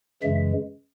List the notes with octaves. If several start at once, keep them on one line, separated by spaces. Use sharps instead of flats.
F#2 C#3 E3 G#3 E5